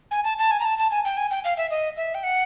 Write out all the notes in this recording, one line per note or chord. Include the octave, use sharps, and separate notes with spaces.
G#5
A5
A5
G#5
A#5
A5
A5
G#5
G5
G#5
G5
F5
E5
D#5
E5
G5
F#5